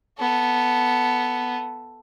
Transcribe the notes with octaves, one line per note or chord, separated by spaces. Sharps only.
B3 A4